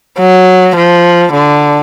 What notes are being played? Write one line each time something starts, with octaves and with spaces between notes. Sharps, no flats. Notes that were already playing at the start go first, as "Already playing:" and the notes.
F#3
F3
D3